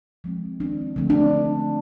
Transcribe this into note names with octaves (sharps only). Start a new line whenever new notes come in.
F3 G#3 C4
D#3 G#3 C4 D4
D3 F3 A3 C4
D4